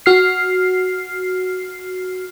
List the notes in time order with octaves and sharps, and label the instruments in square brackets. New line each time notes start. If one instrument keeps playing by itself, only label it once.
[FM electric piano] F#4 F6 C7